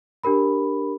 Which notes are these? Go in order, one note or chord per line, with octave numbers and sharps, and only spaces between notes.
D4 G4 A#4 B5